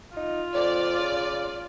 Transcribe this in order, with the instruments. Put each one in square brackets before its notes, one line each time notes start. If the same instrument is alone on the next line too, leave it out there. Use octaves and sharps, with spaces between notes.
[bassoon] D#4 [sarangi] F4
[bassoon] F2 [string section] D5
[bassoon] C#3